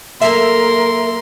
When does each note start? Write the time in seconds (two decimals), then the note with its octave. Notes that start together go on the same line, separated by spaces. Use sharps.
0.21 F#2 A#3 A4 A#4 E5 C6